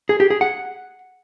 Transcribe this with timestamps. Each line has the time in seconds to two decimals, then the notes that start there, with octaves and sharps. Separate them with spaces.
0.09 G#4
0.20 G4
0.30 G#4
0.41 F#5